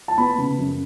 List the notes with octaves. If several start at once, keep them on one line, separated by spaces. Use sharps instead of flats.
A5
B3 B5
C#3
F#2